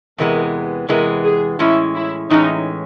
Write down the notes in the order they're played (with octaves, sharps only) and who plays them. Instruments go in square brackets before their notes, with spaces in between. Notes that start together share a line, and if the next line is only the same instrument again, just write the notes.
[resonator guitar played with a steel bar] E2 C3 E3 G#3 B3 [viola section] A#4
[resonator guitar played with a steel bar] E2 C3 E3 G#3 B3 [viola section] A#4
[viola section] G#4
[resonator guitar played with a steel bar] A2 E3 G#3 C#4 [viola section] E4
[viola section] E4
[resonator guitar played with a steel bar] A2 E3 G#3 C#4 [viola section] D#4